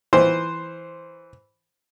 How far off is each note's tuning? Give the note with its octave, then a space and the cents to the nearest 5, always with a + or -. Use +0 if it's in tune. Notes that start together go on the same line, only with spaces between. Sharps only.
E3 +0 C5 +0